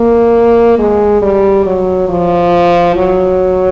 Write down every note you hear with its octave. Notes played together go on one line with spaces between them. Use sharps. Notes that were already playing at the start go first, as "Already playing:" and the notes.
Already playing: A#3
G#3
G3
F#3
F3
F#3